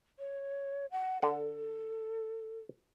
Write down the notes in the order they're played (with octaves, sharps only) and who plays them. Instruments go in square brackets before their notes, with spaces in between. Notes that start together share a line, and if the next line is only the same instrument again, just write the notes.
[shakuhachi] C#5
F#5
[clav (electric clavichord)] D3 F#5 [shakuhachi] A4